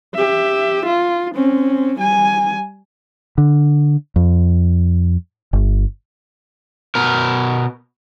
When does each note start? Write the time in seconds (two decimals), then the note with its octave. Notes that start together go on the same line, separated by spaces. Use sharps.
0.15 G4 E5
0.86 F4
1.35 C4 C#4
1.99 G3 G#5
3.38 D3
4.16 F2
5.53 G1
6.95 B2 A#4